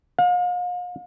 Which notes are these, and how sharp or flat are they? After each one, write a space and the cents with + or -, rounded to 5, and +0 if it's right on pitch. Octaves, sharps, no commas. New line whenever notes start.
F5 +40